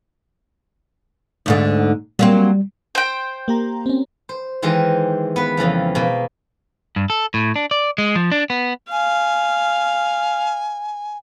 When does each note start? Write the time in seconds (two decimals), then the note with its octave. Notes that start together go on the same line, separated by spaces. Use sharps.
1.46 D2 G#2 D3
2.19 F#3 G3 A#3 C4
2.95 C5 G5
3.48 A#3 G4 A#5
3.86 C4 C#4
4.29 C5
4.62 D#3 E3 G#3 G4 A#4 C5
5.36 B3 B4
5.57 F2 C#3 E3 F3
5.95 B2 A#3
6.96 G2
7.10 A4
7.34 A2
7.56 D4
7.71 D5
7.98 G#3
8.15 F3
8.32 D4
8.50 B3
8.92 F5 G#5